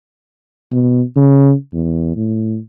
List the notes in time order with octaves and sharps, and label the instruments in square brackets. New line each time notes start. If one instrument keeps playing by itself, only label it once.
[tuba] B2
C#3
E2
A2